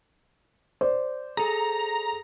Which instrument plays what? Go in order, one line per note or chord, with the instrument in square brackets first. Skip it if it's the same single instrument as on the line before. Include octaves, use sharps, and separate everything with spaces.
[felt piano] C5 D5
[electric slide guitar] G#4 A4 [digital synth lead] A#5